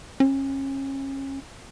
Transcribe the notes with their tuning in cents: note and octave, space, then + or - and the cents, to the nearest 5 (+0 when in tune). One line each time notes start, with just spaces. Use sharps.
C#4 -30